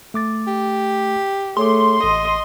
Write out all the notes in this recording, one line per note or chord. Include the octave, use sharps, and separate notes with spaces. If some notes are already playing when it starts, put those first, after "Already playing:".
A3 D6 A6
G4
A3 G#4 C#5 C6 D6
A1 D#5